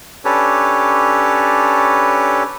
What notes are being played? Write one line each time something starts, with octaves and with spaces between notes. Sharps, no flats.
C#4 D4 G4 A4 B4 C#5